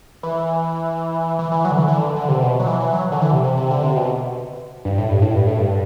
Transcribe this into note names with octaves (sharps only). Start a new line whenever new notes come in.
E3
E3
E3
F#3
D3
E3
E3
D3
D3
C3
B2
F#3
E3
E3
F#3
D3
E3
C3
C3
C3
D3
C3
B2
G2
A2
G2
A2
G2
A2
G2